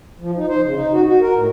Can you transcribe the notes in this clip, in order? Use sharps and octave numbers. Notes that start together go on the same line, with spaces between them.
F3
D#4
C5
C#3
D#4
F#4
F#4
A#4
A2